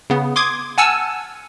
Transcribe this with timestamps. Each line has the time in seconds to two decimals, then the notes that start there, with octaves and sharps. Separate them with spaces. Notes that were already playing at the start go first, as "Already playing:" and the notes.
0.10 C#3 B3
0.36 C6 D6 D#6 G#6
0.78 F#5 G#5 A5 E6 F6